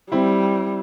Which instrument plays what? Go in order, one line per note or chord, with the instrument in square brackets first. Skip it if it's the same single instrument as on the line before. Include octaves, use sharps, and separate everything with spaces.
[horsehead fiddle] G3 [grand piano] C4 E4